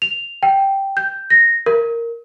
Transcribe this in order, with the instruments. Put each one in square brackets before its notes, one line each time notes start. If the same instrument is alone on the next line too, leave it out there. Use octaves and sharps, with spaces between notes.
[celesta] F7
G5
G6
A#6
A#4